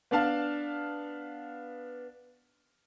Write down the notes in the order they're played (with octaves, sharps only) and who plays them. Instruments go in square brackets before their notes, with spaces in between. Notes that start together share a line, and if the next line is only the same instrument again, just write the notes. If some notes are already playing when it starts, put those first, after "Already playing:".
[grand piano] B3 D4 F5 A5